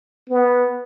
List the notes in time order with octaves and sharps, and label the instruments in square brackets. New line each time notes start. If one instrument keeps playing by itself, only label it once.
[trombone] B3